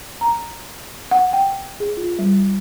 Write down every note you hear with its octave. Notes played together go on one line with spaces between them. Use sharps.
A#5
F#5
G5
G#4
F4
G3